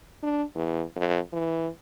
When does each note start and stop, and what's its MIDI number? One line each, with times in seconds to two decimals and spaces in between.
0.23 0.43 62
0.55 0.83 40
0.96 1.18 41
1.33 1.68 52